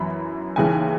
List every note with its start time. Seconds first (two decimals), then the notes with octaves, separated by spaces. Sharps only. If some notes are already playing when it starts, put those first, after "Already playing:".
Already playing: F#2 E3 B5
0.56 D#2 C#3 E3 G#5